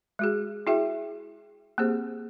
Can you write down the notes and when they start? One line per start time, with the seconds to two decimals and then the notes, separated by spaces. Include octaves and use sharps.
0.19 G#3 F#4 G#4
0.67 E4 F#4 G#4 E5 G5
1.78 A#3 C4 G4 G#4 C5